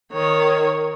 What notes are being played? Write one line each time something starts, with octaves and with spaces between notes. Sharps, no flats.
D#3 C#5